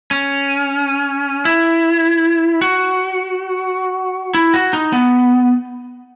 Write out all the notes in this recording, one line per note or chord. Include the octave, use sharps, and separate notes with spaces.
C#4
E4
F#4
E4
F#4
D#4
B3